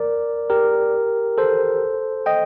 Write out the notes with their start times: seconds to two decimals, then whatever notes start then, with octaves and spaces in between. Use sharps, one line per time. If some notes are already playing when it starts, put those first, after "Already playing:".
Already playing: A#4 D5
0.50 G4 A#4
1.38 A4 C5
2.26 D#5 G5